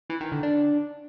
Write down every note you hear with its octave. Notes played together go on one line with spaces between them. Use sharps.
E3
D#3
D3
D4